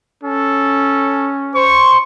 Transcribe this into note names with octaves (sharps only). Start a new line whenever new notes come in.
C#4 A4
C5 C#6